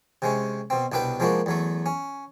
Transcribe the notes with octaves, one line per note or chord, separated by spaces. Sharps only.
C3 G#3 C#4
B2 C4
C2 B2 D4 B4 G5
F3 G#3 A#3 D4 F#4
E2 F#3 A3
C#4